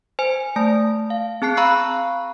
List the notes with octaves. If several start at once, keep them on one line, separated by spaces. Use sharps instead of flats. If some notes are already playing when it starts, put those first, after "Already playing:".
C5 G#5
A3 A5
F5
C4 G#4 A5 F#6 C7
F5 A#5 B5 C#6 E6 F#6